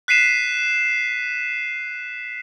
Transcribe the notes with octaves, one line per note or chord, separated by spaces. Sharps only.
F#6 B6 C7 D#7 E7